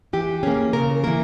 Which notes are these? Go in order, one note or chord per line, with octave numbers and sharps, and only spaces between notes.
E3 G4
A#3 C#4 G#4
C#3 A#4
E3 A#3 A#4